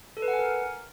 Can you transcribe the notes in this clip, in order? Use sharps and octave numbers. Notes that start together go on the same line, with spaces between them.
A4
B4
F#5
G#5
A#4